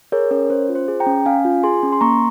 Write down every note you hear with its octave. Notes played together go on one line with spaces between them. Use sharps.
G#4 A#4 C#5
C#4 A#4 C#5
C#4 C5
F4
C5
G#4
G5 A#5
C#4
C#4 F5 G#5
F4
G#4 G#5 C6
C#4
C6
A#3 A#5 C#6